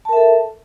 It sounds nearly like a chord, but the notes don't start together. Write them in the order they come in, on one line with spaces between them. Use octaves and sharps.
A5 A#4 E5 A4